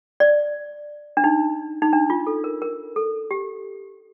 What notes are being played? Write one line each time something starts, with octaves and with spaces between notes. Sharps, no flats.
D5
D4
D#4
D#4
D4
F4
A4
A#4
A#4
A4
G4